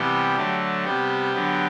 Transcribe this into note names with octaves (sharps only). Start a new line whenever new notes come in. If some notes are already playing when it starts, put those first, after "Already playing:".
Already playing: C3 E3 G3 B3 G4
D3 F#3 A3
C3 G3 B3 G4
D3 F#3 B3